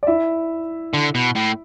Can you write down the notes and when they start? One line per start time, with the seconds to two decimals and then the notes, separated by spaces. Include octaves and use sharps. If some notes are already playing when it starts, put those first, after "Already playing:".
0.03 D5
0.07 E4 E5
0.94 D3
1.15 B2
1.36 A2